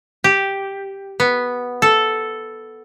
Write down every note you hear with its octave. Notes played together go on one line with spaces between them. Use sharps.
G4
B3
A4